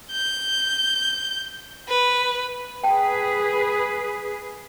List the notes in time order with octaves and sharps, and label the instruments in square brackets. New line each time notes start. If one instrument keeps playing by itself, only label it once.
[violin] G6
B4
[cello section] G#4 B4 [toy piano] G5 A5